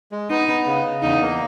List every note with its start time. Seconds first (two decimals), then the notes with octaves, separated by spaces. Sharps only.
0.12 G#3
0.30 B3 D#4
0.48 B3
0.66 C#3
0.84 C#3
1.02 E2 D#4
1.21 A#3